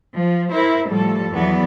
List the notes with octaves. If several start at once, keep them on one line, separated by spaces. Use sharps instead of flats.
F3
E4 A#4 C5
A2 F3 G3 A4
E2 E3 F#3 B3 D5